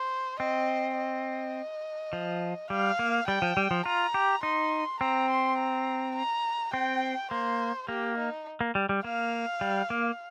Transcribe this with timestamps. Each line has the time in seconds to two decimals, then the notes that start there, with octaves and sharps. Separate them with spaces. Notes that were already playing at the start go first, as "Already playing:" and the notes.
Already playing: C5
0.39 C4 D#5
0.97 D#5
2.13 F3
2.70 G3 F5
2.99 A#3
3.28 G3 G5
3.42 F3
3.57 G3
3.71 F3
3.86 F4 A#5
4.14 G4
4.43 D#4 C6
5.00 C4 A#5
5.30 C6
5.58 A#5
6.16 A#5
6.74 C4 G5
7.31 A#3 C5
7.89 A#3 G4
8.18 D#4
8.61 A#3
8.75 G3
8.89 G3
9.04 A#3 F5
9.61 G3
9.90 A#3